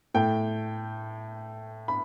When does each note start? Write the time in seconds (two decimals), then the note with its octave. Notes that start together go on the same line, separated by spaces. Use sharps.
0.14 A2 A3 G5
1.88 B5